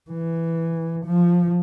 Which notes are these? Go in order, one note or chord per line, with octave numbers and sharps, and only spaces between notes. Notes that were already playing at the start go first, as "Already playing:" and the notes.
E3
F3